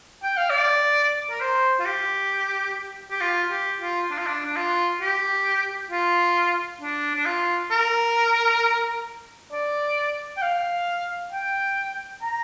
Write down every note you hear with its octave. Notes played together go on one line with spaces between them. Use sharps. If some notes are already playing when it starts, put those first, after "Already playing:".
G5
F5
D5
A#4
C5
F4
G4
G4
F4
G4
F4
D4
F4
D4
D4
F4
G4
F4
D4
D4
F4
A#4
D5
G5
F5
G5
A#5